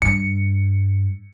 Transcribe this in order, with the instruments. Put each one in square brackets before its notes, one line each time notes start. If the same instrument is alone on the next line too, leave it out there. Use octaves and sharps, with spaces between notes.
[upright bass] G2 [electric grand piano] C#7